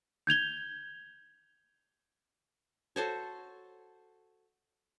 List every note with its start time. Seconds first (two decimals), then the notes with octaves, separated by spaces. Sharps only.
0.27 G6 G#6 F7 G7
2.96 F#4 A4 C5 C#5